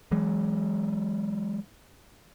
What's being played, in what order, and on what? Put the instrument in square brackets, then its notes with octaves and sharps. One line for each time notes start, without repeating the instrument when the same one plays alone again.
[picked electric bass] E3 F#3 G#3